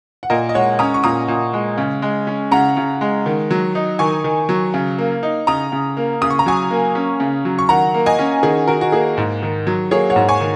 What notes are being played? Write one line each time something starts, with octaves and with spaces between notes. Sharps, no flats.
F#5
A#2 A#4 D#5
D#5
G#3 C#5 F#5
C#4 A#5 D#6
C#6
A#2 A#5 D#6
A#2
G#3
C#3
G#3
C#4
C#3 F#5 A#5
C#3
G#3
D#3
F#3
D#4
D#3 G#5 C#6
D#3
F#3
C#3
A#3
D#4
C#3 A#5 D#6
C#3
A#3
C#3 D#6
C#6
A#5
F#3 G#5 C#6
A#3
C#4
C#3
F#3
C#6
D#3 F#5 A#5
A#3
D#5 G#5
C#4
D#3 G#4
D#3 F#4 A#4
F#4
A#3 G#4
G#2
D#3
F#3
A#3 G#4 C#5
C#5 F#5
G#2
G#5 C#6
D#3